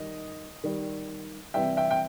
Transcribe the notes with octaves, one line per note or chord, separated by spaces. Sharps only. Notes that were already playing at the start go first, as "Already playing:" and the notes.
Already playing: D#3 G3 D#5
D#3 G3
C3 E3 G3 E5 G5
E5 G5
G5